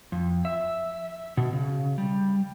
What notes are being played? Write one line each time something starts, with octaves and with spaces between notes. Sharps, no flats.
F2
E5
B2
C#3
G3